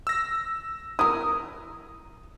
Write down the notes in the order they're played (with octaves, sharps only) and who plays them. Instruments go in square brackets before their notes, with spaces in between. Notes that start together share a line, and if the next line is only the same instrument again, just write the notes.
[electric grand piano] E6 A#6
[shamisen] E4 A#4 [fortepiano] D#6